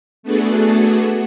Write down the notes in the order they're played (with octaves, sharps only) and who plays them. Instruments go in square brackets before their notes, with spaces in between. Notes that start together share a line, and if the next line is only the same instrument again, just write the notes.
[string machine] A3 B3 D4 F#4 G#4 A4